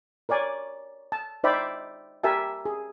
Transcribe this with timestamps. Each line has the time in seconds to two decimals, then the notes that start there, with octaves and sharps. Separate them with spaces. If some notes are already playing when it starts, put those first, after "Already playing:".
0.29 A#4 C#5 D5 G#5
1.12 A5
1.44 D#4 C5 D5 E5 G5 B5
2.23 G4 A#4 E5 G#5 A5
2.65 G#4